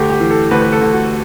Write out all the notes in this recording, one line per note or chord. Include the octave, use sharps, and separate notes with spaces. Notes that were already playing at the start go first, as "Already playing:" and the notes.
Already playing: D2 G4
G4
E3
A4
D2 B4
B4
A4
D2
F#4